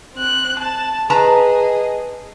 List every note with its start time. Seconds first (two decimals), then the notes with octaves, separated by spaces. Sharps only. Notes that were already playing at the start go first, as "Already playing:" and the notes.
0.14 C4 F#6
0.59 A5
1.10 G#4 B4 D#5 A5 A#5